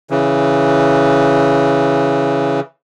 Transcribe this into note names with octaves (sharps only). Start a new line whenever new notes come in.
C#3 E3